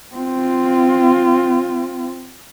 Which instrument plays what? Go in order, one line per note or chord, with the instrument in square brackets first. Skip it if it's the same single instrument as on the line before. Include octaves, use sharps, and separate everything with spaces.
[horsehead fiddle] C4 F4